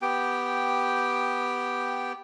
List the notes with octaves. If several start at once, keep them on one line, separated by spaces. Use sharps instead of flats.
B3 G4 G5